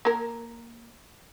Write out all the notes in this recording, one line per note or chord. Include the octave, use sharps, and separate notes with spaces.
A#3 A#4